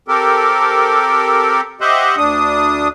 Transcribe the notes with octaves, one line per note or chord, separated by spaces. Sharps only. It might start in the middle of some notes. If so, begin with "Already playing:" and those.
C4 G4 A4 A#4
G4 C5 D#5 E5 F#5
D2 D4 D#6